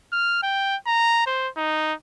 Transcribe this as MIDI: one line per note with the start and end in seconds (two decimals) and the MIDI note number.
0.12 0.38 89
0.43 0.76 79
0.87 1.24 82
1.26 1.49 72
1.57 1.94 63